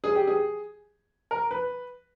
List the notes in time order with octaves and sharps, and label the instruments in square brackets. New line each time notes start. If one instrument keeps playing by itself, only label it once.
[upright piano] G#4
G4
G#4
A#4
B4